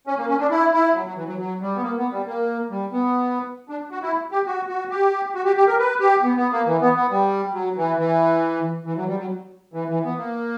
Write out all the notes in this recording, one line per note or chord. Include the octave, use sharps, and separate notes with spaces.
C#4
A#3
C#4
D4
E4
E4
F#3
F#3
E3
F#3
F#3
G3
B3
A#3
B3
G3
A#3
G3
B3
D4
F#4
E4
G4
F#4
F#4
G4
F#4
G4
G4
A#4
B4
G4
B3
B3
A#3
E3
B3
B3
G3
F#3
E3
E3
E3
F#3
G3
F#3
E3
E3
B3
A#3